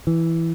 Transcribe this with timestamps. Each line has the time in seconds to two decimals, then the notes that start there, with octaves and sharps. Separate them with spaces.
0.07 E3